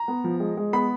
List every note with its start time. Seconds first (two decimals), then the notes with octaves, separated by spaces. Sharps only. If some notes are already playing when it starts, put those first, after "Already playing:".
Already playing: A#5
0.08 B3
0.24 F3
0.40 G#3
0.57 G#3
0.73 B3 B5